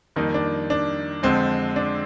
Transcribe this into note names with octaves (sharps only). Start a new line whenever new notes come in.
F2 D#3 G3 A#3 D#4
D4
D4
F2 D3 G#3 C4
D4